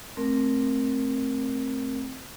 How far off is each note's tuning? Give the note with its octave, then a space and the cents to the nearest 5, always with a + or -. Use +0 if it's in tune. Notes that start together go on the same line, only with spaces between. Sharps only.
A3 +0 C4 +15 A#4 -5